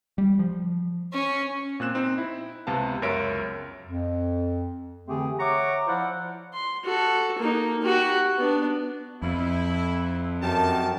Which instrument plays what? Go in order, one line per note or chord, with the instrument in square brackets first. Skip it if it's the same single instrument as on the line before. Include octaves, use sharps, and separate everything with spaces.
[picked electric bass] G3
F3
[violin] C#4
[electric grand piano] A#2 C4 F#6 E7
C4 D#4
E4
C#2 C3 B3 F5 A5
C#2 F#2 A#4 C#5 E5 D7
[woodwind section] F2
D3 E3 A3 C4 G4 G#4
C#5 E5 F#5 A#5 C#6 D6
F3 E4 F4 C5 D5 F#5
[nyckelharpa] C6
F#4 A4
A#3 D#4
F#4 G4
B3 D4
[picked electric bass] F2 [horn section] E4
[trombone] F#2 [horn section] D#3 G4 A5